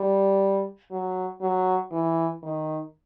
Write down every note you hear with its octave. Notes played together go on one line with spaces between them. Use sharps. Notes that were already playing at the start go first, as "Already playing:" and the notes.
Already playing: G3
F#3
F#3
E3
D#3